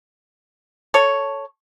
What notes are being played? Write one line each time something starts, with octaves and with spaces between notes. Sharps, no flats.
A4 C#5